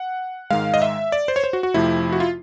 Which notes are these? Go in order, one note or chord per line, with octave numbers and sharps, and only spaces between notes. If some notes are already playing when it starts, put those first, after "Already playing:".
Already playing: F#5
G#2 D#3 G#3 F5
D#5
E5
D5
C5
C#5
C5
F#4
F#4
F2 C3 F3 A3 E4
F#4
F4